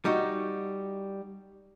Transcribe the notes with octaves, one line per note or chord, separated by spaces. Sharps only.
G3 D#4 F#4